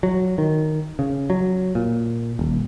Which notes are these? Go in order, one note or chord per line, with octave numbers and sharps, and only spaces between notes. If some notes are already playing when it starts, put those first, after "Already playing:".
F#3
D#3
C#3
F#3
A#2
D#1